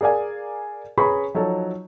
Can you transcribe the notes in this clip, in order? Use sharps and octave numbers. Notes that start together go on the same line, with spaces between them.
G#4 A#4 D5 F5 G#5
C#4 G#4 B4 A#5 B5 C#6
F3 F#3 D#4 A4